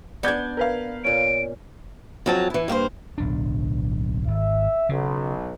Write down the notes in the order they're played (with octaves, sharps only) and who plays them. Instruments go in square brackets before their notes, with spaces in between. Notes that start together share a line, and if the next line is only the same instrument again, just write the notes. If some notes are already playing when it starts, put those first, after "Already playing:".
[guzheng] B3 D4 [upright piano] D5 G6 G#6
[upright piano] A#4 B4 F5
[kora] A#2 C#4 [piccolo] D7
[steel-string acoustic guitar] F2 F#3 A5
E3 E4
G2 A#3 G4 C5
[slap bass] D1 B1 D4
[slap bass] G#1 [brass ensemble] E5
[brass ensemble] B1 [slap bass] C#3